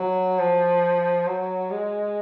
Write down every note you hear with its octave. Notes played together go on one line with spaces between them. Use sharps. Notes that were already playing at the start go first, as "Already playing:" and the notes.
Already playing: F#3
F3
F#3
G#3